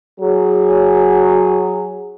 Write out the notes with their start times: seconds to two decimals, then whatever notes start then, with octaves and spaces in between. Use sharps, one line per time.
0.21 F#3 G#4